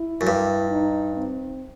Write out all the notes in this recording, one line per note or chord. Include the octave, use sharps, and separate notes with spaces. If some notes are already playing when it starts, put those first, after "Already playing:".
Already playing: E4
F#2
G2
D#4
C4